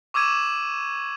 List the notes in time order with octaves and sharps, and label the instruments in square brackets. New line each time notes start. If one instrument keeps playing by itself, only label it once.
[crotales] C#6 D6 E6 G#6 D#7 E7